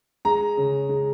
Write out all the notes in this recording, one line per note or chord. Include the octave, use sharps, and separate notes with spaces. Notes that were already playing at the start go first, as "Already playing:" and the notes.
G#3 A#5
C#3
G#3